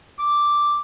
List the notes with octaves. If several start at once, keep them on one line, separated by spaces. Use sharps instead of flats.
D6